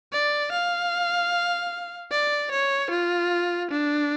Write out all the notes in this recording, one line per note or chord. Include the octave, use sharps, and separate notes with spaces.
D5
F5
D5
C#5
F4
D4